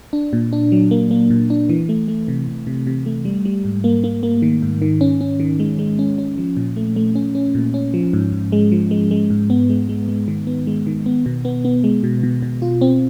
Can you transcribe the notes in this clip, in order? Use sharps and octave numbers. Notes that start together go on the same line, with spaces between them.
D4
A#2
D4
F#3
A#3
A#3
A#2
D4
E3
A3
A3
C3
C3
C3
C3
A3
G3
G3
G#2
A#3
A#3
A#3
D#3
G#2
D#3
C#4
C#4
D#3
G#3
G#3
C#4
C#4
F3
A#2
A3
A3
C#4
C#4
A#2
C#4
F3
G#2
G#2
G#3
F3
G#3
G#3
G#2
B3
G#3
G#3
G#3
D#3
B3
G#3
D#3
B3
B2
B3
B3
G#3
B2
B2
B2
F4
C4